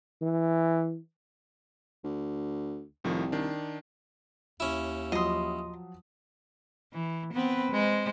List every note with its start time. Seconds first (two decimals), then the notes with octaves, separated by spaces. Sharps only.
0.22 E3
2.04 D2
3.04 C2 A2 D#3 F3
3.32 D#3 D4
4.60 D#2 C#4 E4
5.12 F3 F#3 D#5 C6 D#6
6.93 E3
7.33 B3 C4 B4
7.72 G#3 C5